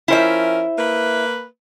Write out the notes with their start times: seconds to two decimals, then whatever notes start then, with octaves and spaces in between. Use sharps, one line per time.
0.08 F3 C#4 E4 A#4 C5 E5
0.78 A#3 B4